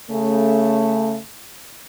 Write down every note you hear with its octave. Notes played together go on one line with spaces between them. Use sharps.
C#3 A3